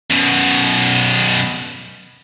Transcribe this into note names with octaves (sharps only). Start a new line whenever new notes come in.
F#2 B2